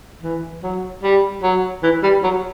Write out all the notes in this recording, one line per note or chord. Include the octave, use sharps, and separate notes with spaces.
E3
F#3
G3
F#3
E3
G3
F#3